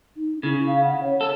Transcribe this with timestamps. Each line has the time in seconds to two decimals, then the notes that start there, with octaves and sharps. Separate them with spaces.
0.17 D#4
0.43 C#3 E4
0.67 F5
0.83 F#5
1.03 C#5
1.21 A4